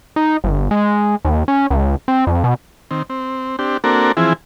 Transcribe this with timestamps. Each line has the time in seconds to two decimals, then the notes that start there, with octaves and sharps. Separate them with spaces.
0.16 D#4
0.44 G1
0.71 G#3
1.25 D#2
1.48 C#4
1.70 C#2
2.08 C4
2.27 F2
2.44 B2
2.91 D#3 C4
3.10 C4
3.59 C4 D4 G4
3.84 A#3 C4 D4 F#4 A4 A#4
4.17 E3 F3 C4 E4 G#4